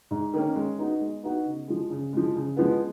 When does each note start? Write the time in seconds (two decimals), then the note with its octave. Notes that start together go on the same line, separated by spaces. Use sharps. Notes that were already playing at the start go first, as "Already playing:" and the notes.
0.11 G#2
0.34 D#3 A#3 C#4
0.56 G#3
0.78 B3 D#4 F#4
1.00 G#3
1.23 B3 D#4 F#4
1.45 C#3
1.68 F3 G#3
1.90 C#3
2.13 F3 G#3
2.35 C#3
2.57 F3 G#3 B3